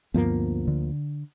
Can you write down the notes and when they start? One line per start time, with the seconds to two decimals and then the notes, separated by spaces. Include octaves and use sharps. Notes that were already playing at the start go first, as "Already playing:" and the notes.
0.14 D2 G2 F3 A#3 B3
0.68 D3